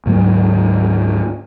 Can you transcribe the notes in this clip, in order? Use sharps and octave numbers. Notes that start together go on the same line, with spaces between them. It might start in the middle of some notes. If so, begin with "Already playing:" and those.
D2 G#2 F#3 A#3